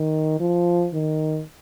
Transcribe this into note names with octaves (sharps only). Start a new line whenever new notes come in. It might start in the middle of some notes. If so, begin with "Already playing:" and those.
Already playing: D#3
F3
D#3